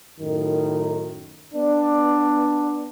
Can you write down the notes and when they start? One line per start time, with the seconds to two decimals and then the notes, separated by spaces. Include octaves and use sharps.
0.20 F#2 A2 D#3
1.54 B3 D4